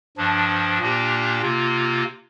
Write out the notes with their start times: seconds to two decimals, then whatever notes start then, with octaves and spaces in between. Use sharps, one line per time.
0.17 G2 F3 D4
0.79 A#2 A#3 D4 G4
1.41 C3 A#3 F4